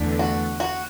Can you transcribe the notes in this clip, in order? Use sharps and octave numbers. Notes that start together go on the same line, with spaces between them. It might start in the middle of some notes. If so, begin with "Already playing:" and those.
Already playing: E2 D3 A3
F#4
F#4